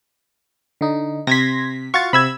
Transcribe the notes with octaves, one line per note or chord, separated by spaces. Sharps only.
D3 D#4
C3 C6 G#6 A#6 B6
F4 F#4 F5 C#6 A6
C3 B5 E6 G#6